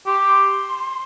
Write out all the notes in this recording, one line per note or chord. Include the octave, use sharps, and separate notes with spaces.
G4 C6